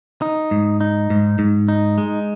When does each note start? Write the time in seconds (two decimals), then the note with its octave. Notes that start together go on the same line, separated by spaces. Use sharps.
0.22 D#4
0.51 G#2
0.81 D#4
1.10 G#2
1.39 G#2
1.68 D#4
1.98 G#3